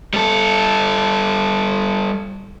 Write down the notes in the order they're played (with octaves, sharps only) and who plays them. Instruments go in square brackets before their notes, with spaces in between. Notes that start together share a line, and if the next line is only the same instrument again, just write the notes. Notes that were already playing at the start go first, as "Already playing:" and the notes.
[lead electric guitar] G3 A4